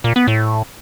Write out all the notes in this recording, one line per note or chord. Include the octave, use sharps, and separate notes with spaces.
A#2
B3
A2